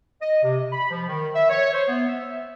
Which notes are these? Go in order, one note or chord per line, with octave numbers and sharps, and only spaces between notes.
D#5
C3
B5
F3
D#3
E5
C#5
C5
B3
E5